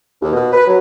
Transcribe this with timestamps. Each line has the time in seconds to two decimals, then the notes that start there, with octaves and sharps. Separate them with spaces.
0.21 D#2
0.32 B2
0.53 B4
0.66 F#3